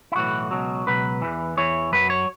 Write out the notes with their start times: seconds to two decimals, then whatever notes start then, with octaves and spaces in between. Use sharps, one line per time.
0.12 E4
0.15 B1 A2 E3 F#4
0.51 C#2 B2 F#3
0.87 C#2 B2 F#3 B4
1.22 E2 E3
1.57 E2 E3 C#5
1.93 F#2 F#3 B4
2.10 C#5